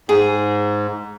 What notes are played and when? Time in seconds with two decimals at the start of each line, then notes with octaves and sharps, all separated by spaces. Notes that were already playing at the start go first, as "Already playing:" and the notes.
0.09 G#2 G#4